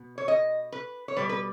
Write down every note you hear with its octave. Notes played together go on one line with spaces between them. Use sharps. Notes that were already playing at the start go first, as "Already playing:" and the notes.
Already playing: B2
C#5
D#5
B4
C#5
B2 G3 B4
B4